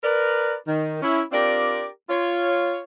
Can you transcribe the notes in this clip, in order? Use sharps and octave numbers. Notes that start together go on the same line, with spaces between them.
A#4 B4 D5
D#3
C#4 E4
C4 D4 F4 G4 A#4 D5
F4 C#5